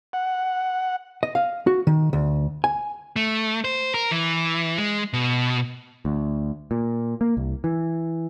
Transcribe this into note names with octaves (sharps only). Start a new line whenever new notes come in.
F#5
D#5
F5
F#4
D#3
D2
G#5
A3
C5
A#4
E3
G#3
B2
D2
A#2
A#3
C2
E3